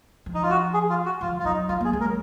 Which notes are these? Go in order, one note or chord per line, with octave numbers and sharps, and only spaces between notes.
F3
D#4
F4
F#4
G#4
F4
F#4
F3 F4
F4
F#3 D#4
F#3 F4
A#3
G#4
G#3
A#4
F#3